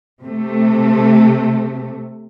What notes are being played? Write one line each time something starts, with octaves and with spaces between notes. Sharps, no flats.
C3 A3